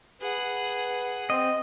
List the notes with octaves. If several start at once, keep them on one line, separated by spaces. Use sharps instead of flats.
G#4 B4 F#5
C4 D#5